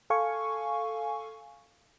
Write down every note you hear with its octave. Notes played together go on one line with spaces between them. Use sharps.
A4 F5 G#5 C#6